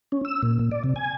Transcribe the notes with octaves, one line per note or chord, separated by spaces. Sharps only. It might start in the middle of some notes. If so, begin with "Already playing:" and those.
C#4
E6
A#2
A#2
D5
C3
G#5